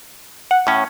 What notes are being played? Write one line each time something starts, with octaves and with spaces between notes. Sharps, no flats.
F#5
A2 C#4